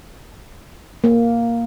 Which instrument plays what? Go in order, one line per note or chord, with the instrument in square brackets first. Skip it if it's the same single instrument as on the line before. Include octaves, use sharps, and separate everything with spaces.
[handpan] A#3